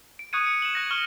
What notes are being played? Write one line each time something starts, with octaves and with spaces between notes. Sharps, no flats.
D7
C#6 D#6 F#6 G#6 C#7 D#7
C#7
E7 F#7
F#6 A#6
C#6 D#6 F6 G#6 E7 G7